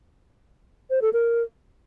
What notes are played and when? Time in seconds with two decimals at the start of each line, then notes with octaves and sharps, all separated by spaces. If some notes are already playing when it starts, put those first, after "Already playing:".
0.90 C5
1.02 A4
1.13 A#4